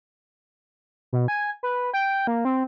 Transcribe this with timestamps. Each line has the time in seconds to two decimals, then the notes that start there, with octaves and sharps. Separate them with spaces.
1.13 B2
1.28 G#5
1.63 B4
1.94 G5
2.27 A#3
2.45 C4